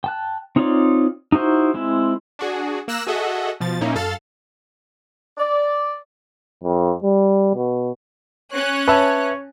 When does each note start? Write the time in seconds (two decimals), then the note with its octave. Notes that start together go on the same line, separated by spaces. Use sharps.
0.04 G5 A5 F#6
0.56 C4 D#4 F4 C#5 D5
1.32 D#4 E4 F#4 C5
1.74 G#3 C4 E4
2.39 D4 F#4 G#4
2.88 A#3 E6 F#6 A#6 E7
3.07 F#4 G#4 A4 D#5 E5 F#5
3.60 B2 F3 A6
3.81 A#2 A#3 C#4 D#4 E4
3.95 F#2 A4 F5 A6
5.38 D5
6.64 F2
7.04 G3
7.56 B2
8.53 C#4 C#5 F#6
8.88 B4 E5 A5